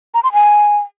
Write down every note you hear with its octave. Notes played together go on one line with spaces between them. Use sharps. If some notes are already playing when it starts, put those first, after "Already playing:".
A#5
C6
G#5